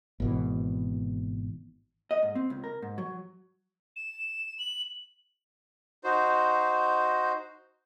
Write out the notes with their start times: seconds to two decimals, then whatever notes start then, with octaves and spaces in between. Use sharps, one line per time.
0.20 G#1 B2 E3
2.11 D#5
2.23 G#2
2.35 C4
2.50 C#2
2.64 A#4
2.82 G#2
2.98 F#3
3.96 E7
4.59 F#7
6.04 D#4 F#4 C5